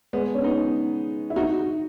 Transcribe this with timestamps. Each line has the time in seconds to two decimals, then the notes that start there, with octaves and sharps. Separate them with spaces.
0.13 G#3 B3
0.34 C#4
0.44 B3 D#4
1.30 E4
1.36 D#4 F#4